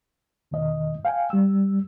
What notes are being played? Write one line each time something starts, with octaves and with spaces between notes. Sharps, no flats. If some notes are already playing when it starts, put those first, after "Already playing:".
E2 B2 D#3 D#5
F5 G5 G#5
G3 E6